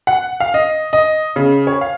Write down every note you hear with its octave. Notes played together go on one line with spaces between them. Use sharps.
F#5
F5
D#5
D#5
C#3
C#5
F5